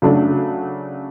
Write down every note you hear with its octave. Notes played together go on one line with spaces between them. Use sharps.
C#3 F#3 A3 D4